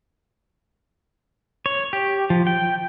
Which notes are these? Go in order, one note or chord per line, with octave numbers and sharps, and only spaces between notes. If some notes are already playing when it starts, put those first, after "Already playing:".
C#5
G4
F3
G5